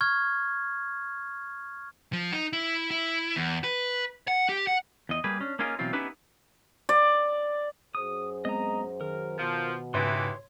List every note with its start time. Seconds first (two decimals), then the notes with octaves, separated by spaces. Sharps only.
0.01 C#6 F6 G#6
2.13 F3
2.32 D#4
2.53 E4
2.91 E4
3.36 E2
3.64 B4
4.28 F#5
4.49 G4
4.67 F#5
5.09 E2 D#5
5.24 G3 A#3 G4 G#4 B4
5.41 C#4 D4
5.59 A#3 C#4 D#4 F4 G#4 A#4
5.79 B2 E3 F#3 C4 F4
5.93 B3 C#4 D#4 E4 G4 B4
6.89 D5
7.95 F#2 G#4 C5 D#6
8.45 G#3 B3 C4 D#5 A#5
9.01 D#3 A#4
9.38 B2 F3
9.94 D#2 G#2 C#3 E3 C#5 C6